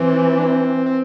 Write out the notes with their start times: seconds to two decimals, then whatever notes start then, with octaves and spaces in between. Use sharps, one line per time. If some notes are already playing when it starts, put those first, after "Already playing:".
Already playing: E3 C4
0.38 D4
0.44 C4
0.86 C4